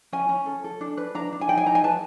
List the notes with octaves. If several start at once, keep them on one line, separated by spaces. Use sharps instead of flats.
C#4 G#5
C#4
A4
A4
D4
B4
D4 A#5
D4
G#5
D#4 G5
G#5
D#4 A#5
G#5
B4 A5